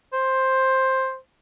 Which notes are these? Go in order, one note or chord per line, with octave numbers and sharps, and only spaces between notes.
C5